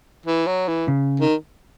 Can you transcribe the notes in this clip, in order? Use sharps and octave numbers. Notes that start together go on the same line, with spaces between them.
E3
F#3
E3
C#3
D#3